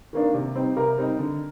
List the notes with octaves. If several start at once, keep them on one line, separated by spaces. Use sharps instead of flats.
D#3 A#3 D4
C3
G3 C4 D#4
C3 A#4
G3 C4 D#4
D3